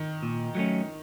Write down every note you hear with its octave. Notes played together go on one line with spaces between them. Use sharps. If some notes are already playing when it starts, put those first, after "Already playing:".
Already playing: D#3
A#2
F#3 A3 C#4